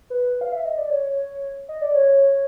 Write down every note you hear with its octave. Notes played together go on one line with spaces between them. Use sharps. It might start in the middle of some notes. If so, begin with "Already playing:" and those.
B4
F5
E5
D#5
D5
C#5
D#5
D5
C#5